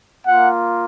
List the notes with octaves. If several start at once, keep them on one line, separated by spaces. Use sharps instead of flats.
A#3 F4 F#5